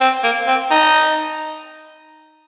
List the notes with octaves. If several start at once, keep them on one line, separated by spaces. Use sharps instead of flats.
C4
A#3
C4
D#4